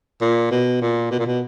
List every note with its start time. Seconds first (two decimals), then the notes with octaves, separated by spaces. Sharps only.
0.21 A#2
0.51 B2
0.82 A#2
1.11 B2
1.19 A#2
1.26 B2